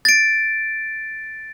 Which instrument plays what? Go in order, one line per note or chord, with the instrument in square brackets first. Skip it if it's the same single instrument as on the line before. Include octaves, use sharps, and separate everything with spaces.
[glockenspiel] A6 D7